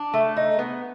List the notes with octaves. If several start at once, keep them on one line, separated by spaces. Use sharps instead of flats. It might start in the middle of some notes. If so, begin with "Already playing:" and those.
Already playing: D4
A3
D#4
B3